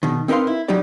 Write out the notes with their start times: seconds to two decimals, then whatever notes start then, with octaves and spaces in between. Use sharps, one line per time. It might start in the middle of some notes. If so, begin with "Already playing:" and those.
0.03 B2 D#3
0.28 C4 D#4 A#4 B4 F5 C6
0.47 E4
0.68 F#3 G3 D#4 G4 D5